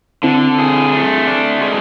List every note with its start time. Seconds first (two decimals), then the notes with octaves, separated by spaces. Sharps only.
0.23 D3 C4 E4
0.59 G#4
0.93 A3
1.27 D4
1.61 G#3